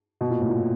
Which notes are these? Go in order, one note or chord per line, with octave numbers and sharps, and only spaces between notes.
B2
A#2
A2
A#2